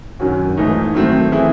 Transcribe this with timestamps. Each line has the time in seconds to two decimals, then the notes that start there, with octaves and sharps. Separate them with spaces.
0.20 F#2 D#3 F#3 C#4 F#4
0.57 G#2 E3 A3 D#4
0.94 D#3 F#3 A3 C4
1.32 E3 C4 E4 G#4